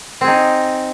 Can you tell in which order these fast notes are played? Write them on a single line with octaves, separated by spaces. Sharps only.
C4 G#4 D#4